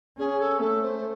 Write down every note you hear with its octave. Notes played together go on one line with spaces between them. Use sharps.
C#4 G#4
A4
A3 A4
C5